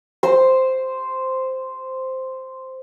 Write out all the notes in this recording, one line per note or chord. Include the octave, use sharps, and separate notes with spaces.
C5 C6